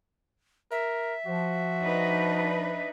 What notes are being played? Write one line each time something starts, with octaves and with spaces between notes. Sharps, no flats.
A#4 E5
F3 F#4
D4 D#4 B4